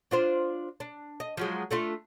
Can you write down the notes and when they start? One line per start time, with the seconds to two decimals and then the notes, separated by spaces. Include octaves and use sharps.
0.11 D4 F4 C5
0.80 D4
1.20 D#5
1.37 F3 F#3 G#3
1.71 A3 D4 F4